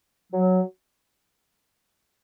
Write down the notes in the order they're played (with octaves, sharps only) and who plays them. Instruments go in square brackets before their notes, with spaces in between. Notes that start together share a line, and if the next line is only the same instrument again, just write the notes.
[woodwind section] F#3